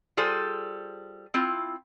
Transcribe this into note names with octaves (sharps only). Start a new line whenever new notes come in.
G3 F4 G#4 A4 C5 G#5
C4 E4 F4